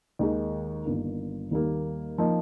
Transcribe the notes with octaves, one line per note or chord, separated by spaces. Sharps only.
D#2 D#3 G#3 D#4
G1 G2 D#3 A#3
D#2 D#3 G3 A#3
F3 A#3 D#4